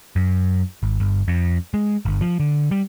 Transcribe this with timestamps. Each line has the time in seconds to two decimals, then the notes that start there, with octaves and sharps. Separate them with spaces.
0.16 F#2
0.83 G#1
1.00 G1
1.28 F2
1.74 G#3
2.05 G1
2.21 F3
2.40 D3
2.71 G3